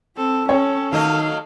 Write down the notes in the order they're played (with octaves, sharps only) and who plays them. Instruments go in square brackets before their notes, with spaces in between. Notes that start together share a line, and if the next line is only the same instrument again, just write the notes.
[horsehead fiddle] C4 [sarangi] A4
[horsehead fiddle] C#4 [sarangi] A4 [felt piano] C#5 G5
[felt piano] D#3 [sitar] F#3 A3 D#5 [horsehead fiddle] F5